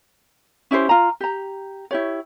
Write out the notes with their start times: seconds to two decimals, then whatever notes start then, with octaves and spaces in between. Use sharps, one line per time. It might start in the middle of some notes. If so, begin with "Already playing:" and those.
0.71 C#4 E4 G4 C5
0.89 F4 A#5
1.21 G4 A#5
1.91 E4 G4 C#5